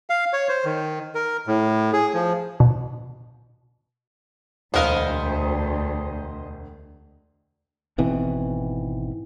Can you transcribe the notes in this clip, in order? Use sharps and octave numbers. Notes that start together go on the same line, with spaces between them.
F5
C#5
C5
D#3
A#4
A2
G#4
F3
B2
E1 D2 B3 A#4 C5 D#5 F5
G#1 B2 E3 C4